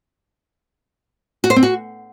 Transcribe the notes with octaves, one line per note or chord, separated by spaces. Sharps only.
F#4
C5
C4
F#4